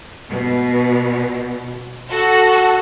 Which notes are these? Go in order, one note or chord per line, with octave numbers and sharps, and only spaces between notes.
B2
F#4 A4